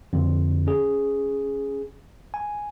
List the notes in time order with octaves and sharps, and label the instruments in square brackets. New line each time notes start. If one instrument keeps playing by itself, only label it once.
[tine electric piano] F2 D3
C#4 G#4
G#5